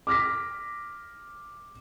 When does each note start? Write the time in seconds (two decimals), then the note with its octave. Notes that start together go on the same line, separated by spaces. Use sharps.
0.07 D6 F6 A#6 B6